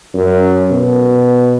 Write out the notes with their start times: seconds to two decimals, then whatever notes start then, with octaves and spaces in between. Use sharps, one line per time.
0.14 F#2
0.70 B2